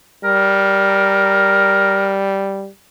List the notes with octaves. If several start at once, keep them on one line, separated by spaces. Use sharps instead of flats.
G3 A#4